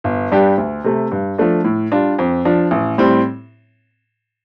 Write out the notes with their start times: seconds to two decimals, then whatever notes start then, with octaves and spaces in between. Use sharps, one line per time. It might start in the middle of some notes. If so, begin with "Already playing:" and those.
0.04 G1
0.32 G2 G3 D4 G4
0.58 D2
0.84 C3 A3
1.11 G2
1.38 F3 A3 D4
1.64 A2
1.92 G3 D4 F4
2.19 F2
2.45 F3 D4
2.71 A1
2.98 A2 G3 C4